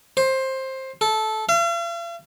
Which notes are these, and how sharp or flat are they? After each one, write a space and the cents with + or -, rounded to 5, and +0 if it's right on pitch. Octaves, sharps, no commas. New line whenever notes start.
C5 +15
A4 -15
F5 -45